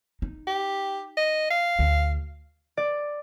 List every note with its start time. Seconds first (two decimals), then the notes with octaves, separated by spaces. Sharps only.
0.22 D#4
0.47 G4
1.17 D#5
1.50 F5
1.79 D2
2.77 D5